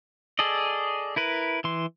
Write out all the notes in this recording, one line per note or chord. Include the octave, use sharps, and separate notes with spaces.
G#4 A4 D5 D#5
E4 A#4 B4
E3 C6